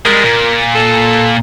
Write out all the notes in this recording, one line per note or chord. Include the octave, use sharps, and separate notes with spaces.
G3 G#3 A#4
A#2
A4